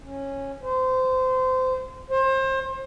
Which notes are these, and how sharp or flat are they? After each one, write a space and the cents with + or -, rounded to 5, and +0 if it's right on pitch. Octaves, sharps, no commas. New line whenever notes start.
C#4 -10
C5 -25
C5 +30